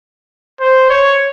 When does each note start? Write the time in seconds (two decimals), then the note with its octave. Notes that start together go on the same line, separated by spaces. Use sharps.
0.61 C5
0.90 C#5